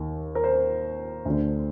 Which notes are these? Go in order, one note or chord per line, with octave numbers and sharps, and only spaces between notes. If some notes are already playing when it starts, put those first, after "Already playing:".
Already playing: D#2 D#3
A#4
C5
D2 D3